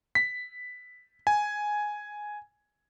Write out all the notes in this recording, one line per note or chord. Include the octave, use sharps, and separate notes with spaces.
B6
G#5